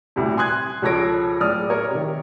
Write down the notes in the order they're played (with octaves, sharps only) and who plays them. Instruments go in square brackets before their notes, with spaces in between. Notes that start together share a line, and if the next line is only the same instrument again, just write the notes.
[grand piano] D#1 D2 A2 C3
G#5 C6 D#6 F#6 G#6
C#2 F3 A4 C#5 A#6 D7
D1 D5 D#6 F6
A#4 C#5 D5
C3 D#3